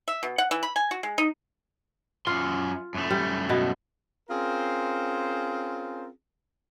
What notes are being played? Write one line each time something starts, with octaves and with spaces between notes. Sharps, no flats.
E5
B2
F#5
E3
B5
G#5
F#4
G#3
D#4
F#2 F4 C6
F#2 A3
G3
B2 B3
C4 C#4 F4 G#4 A#4 C5